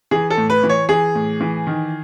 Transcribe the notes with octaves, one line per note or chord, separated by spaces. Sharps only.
E3 G#4
A4
A2
B4
E3
C#5
E3 G#4
A2
E3
D#3